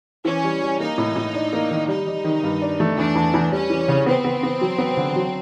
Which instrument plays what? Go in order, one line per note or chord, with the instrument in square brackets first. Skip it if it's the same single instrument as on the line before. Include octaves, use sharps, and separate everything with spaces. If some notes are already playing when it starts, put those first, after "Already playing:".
[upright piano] E3 [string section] C#4
[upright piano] G3
G3
[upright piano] A#3 [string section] D#4
[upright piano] A2
A2
D4
A#3
D#3
[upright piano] G3 [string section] D#4
[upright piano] G3
D#3
G2
D4
A3
[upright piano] E2 [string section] D4
[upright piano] E2
E2
[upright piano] G3 [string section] C#4
[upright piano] E3
C#3
[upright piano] B3 [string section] C4
[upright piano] B3
B3
F#3
B3
D3
F#3